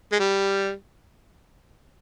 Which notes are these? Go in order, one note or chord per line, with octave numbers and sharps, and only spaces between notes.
G#3
G3